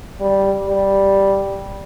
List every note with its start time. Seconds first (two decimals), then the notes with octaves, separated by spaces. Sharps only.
0.20 G3
0.68 G3